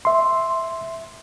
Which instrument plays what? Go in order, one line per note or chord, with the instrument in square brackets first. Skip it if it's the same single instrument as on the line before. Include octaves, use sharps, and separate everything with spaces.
[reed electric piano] E5 C6